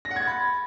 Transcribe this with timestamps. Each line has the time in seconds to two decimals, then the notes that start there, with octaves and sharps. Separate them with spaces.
0.05 A#6
0.11 F#5
0.16 G#6
0.22 A6
0.27 B5